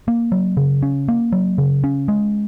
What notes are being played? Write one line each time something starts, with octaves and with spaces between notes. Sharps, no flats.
A#3
F#3
C#3
C#4
A#3
F#3
C#3
C#4
G#3